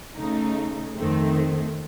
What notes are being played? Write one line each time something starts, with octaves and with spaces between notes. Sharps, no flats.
C#3 A3 D#4
F2 D#3 A3 C4